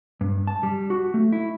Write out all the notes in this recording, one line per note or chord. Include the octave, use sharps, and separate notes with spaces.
G2
A5
G3
F#4
A3
E4